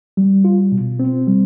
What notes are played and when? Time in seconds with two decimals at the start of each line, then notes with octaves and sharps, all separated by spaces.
0.17 G3
0.45 F4
0.72 B2
1.00 C4
1.27 G3